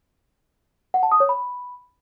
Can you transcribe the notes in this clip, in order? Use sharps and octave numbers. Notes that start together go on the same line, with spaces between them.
F#5
A5
D#6
C#5
B5